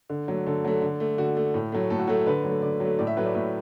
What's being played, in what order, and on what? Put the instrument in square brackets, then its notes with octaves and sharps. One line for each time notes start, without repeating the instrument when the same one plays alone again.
[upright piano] D3
F#3 A3
D3 A4
F#3 A3
D3
A3
D3 F#4
A3
A2
F#3 A3
A2 A4
F#4
F#3 A3 A4
D3 B4
F#3 A3
D3 D5
F#3 A3
A2 D5
E5
F#3 A3 B4
D5
A2 E5